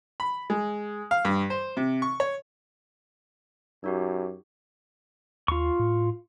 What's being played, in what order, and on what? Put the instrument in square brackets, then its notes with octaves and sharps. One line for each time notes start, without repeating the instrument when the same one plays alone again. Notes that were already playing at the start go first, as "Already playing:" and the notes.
[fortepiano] B5
G#3
F5
G2
C5
C3
C#6
C#5
[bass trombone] F#2 [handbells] D#4 F#4 G4
[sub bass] D#2 [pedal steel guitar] F4 C#6
[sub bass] A2